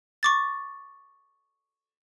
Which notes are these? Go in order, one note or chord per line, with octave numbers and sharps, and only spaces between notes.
C#6 D6 A6